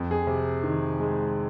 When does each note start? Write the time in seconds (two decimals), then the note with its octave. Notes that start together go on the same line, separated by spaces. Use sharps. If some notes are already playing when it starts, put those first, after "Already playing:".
Already playing: F2
0.11 G#4
0.27 C3
0.63 D#3
1.00 G#3